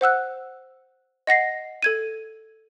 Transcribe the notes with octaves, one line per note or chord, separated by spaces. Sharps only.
C5 F#5 E6 F#6
D#5 F#5 A#6 C7
A4 G#6 D#7